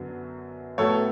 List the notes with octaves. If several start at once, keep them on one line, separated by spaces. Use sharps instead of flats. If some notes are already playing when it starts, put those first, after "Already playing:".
Already playing: F#2 D3 F#3 B3
A2 F#3 B3 A4 C#5